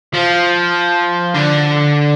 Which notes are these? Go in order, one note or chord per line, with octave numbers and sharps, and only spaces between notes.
F3
D3